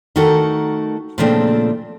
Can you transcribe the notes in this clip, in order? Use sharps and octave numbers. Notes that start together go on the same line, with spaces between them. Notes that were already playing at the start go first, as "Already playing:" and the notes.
D#3 A3 D#4 F#4 A4 A#4
A#2 C#3 F3 A3 C4 D4